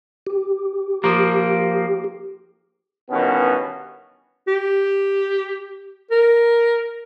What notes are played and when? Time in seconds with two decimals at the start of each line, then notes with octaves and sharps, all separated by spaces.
0.27 G4
1.04 F3 A#3
3.11 G2 B2 D#3 E3 B3 C#4
4.48 G4
6.11 A#4